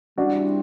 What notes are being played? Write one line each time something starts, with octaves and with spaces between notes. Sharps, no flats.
G3 C4 D4 E4 F#4